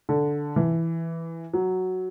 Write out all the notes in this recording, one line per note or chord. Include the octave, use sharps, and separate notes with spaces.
D3
E3
F#3